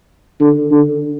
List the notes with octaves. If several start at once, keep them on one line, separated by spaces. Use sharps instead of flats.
D3
D3